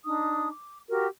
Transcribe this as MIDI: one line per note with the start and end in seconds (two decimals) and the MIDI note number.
0.05 0.49 62
0.05 0.49 63
0.05 0.49 87
0.51 0.78 86
0.90 1.06 66
0.90 1.06 67
0.90 1.06 70